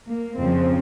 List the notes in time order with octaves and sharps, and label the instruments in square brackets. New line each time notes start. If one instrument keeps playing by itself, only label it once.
[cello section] A#3
F2 C#3 F3 C4